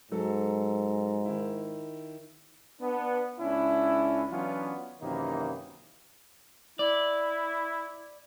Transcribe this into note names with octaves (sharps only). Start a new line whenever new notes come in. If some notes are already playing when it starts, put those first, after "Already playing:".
G#2 F#3 A4
D#3 E4
B3 D4
C#2 C#4 D4 E4
E3 F#3 B3 C#4 D4 F4
F#2 C3 D#3 E3 A#3 D#4
E4 D5